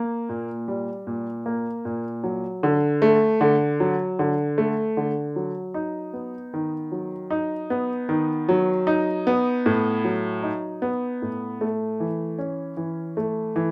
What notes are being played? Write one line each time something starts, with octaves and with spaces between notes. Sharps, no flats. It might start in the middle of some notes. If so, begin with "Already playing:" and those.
Already playing: A#3
A#2
G3
A#2
A#3
A#2
F#3
D3
A3
D3
F#3
D3
A3
D3
F#3
D#4
B3
D#3
F#3
D#4
B3
D#3
F#3
D#4
B3
A2
F#3
D#4
B3
A2
A3
E3
C#4
E3
A3
E3